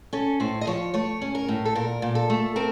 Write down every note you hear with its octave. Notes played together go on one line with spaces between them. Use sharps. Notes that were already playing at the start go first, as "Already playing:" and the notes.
C#4 A4
A2 C5
D#5
F3 C#5
A3 C#5
C#4
A#4
A2
A4
A#2 A#4
A#2
A4
A3
C4 A#4